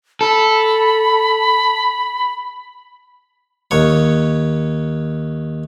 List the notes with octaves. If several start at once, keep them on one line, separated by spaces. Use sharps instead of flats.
A4 B5
D#2 C#5